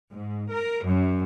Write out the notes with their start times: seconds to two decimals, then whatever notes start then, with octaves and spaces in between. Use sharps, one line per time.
0.11 G#2
0.50 A#4
0.86 F#2